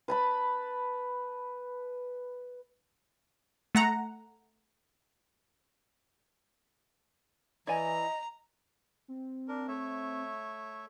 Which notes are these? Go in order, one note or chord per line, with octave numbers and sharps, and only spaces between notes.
B4 A5 B5
A3 F#5 A#5
E3 E4 D5 D#5 G#5 A#5
C4
D4 A#4
A3 C#5 E5